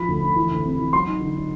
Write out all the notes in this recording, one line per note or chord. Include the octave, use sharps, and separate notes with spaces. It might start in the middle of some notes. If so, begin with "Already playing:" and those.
Already playing: F3 B5
D2
D2
E3
D2
C3
E3
F#3 C6
D#4
D3
D#4